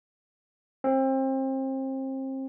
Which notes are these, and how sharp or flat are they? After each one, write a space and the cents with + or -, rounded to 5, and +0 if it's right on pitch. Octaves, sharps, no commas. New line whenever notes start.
C4 +30